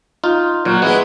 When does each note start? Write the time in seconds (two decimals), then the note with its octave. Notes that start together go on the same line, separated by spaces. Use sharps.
0.24 D#4 F4
0.65 A#2 F#3
0.82 G#3 B3 E4